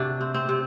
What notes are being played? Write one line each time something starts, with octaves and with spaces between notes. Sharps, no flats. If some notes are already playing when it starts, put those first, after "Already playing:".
Already playing: C3 D4 F#4
C4
C4
C3